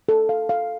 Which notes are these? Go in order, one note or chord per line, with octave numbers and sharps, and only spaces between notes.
A4
F5
F5